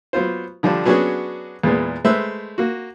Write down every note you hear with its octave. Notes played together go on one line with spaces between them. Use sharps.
F#3 B3 F4 C5
D3 F3 G3 D4
F#3 B3 C#4 D4 F#4 G#4
E2 A#2 G#3 B3
G#3 A3 B4 C5 E5
A#3 F#4